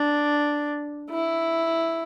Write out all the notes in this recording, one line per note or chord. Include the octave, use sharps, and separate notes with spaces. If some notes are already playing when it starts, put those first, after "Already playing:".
Already playing: D4
E4